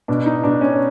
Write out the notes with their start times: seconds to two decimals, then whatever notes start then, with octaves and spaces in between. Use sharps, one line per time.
0.08 B2 D4
0.26 D#4
0.44 B2 D4
0.61 C#4